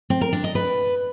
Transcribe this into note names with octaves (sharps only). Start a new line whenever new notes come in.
C4
A#4
D4
D#5
B4